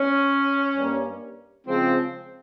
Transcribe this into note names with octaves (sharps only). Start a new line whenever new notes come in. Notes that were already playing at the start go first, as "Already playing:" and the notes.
Already playing: C#4
G2 G3 A#3
C#3 F3 G#3 C4